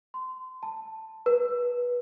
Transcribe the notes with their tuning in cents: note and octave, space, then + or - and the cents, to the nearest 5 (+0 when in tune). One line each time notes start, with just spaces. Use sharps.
C6 -25
A5 +5
B4 -20